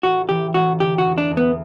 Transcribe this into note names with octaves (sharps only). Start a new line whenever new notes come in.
A1 F#4
E3 G4
A1 F#4
D3 G4
F#4
E2
D4
E2
B3